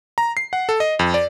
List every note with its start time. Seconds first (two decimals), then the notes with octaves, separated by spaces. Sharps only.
0.18 A#5
0.37 C7
0.53 F#5
0.69 A4
0.80 D#5
0.99 F2
1.14 D5